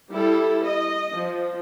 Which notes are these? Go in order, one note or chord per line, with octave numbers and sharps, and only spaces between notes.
G3 E4 A4
D#5
F3